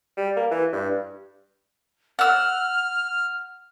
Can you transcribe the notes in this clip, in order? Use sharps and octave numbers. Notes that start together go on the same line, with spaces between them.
G3
A#3
E3
G2
F#5 E6 F6